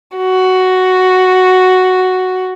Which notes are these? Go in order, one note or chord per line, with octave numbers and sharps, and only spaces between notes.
F#4